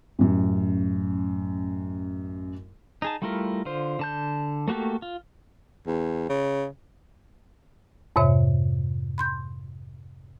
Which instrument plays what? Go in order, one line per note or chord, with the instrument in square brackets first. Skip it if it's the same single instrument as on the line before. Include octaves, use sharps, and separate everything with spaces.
[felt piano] A1 F#2
[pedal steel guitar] D#4 G#4 A5
G3 A3 E4 F4 A#4
D3 F4 C5
D3 A5 G6
A3 A#3 F#4 G4 A4
F4
[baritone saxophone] E2
C#3
[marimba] F2 G#2 C3 C#5 E5
B5 C6 G6